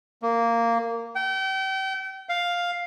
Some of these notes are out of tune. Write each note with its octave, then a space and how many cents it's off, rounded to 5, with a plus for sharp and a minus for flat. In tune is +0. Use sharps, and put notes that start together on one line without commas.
A#3 -10
G5 -35
F5 +5